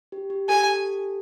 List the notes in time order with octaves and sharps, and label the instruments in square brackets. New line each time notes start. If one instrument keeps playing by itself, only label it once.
[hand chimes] G4
G4
[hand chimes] G4 A4 [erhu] G#5